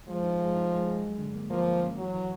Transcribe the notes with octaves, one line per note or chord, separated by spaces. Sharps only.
F3 G#3
D#4
G#3
D#4
G#3
G#3
F#3
D3
A#3
F3 A#3
A#3
C#4
E3 F#3
E3